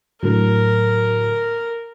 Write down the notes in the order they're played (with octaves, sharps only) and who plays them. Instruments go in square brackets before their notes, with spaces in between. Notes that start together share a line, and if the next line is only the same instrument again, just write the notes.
[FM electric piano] A2 D3 F#3 [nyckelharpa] A#4